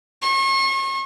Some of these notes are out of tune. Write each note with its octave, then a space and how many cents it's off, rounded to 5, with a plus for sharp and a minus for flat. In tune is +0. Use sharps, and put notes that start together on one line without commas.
C#6 -40